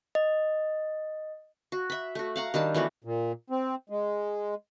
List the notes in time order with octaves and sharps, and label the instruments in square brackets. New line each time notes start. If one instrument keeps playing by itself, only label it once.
[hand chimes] D#5
[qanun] F#4
E5 B5
A3 F#4
F5 F#5 A#5
D#3 G3 D4 A5
E3 A3 B3 F#4
[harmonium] A#2
C4
G#3